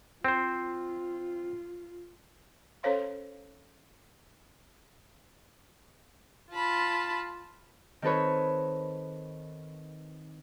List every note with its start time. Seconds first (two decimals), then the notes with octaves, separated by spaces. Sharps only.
0.25 C4 F4 C5
2.83 C#4 A4 C5 C#5 F5 C6
6.52 F4 A5 B5
8.02 D#3 C4 A4 B4 C#5